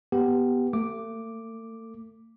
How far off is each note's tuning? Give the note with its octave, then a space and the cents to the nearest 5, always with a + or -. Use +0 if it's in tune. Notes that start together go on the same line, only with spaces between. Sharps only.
B3 -5 G4 +0
A3 +40 D6 +0